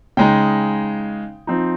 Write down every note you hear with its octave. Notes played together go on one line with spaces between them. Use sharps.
C#3 G#3 D#4 G5
F3 C4 D#4